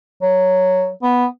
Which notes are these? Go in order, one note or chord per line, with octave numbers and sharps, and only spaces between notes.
F#3
B3